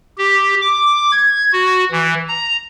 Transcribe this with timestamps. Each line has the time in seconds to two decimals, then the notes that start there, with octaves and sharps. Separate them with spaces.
0.18 G4
0.61 D6
1.12 G#6
1.53 F#4
1.92 E3
2.29 A#5